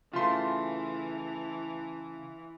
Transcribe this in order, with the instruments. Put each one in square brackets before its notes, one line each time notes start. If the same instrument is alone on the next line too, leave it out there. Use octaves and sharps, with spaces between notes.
[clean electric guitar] C#3 A3 [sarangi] E3 [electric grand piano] F4 C6